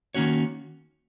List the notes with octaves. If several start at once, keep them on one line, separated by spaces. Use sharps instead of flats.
D#3 A#3 C#4 F#4 C#5